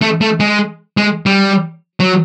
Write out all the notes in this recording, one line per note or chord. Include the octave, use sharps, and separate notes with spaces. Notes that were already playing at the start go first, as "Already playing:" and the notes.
A3
A3
G#3
G#3
G3
F#3